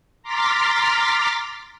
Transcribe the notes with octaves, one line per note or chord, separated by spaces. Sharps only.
A#5 C6 D6 F6 A6 B6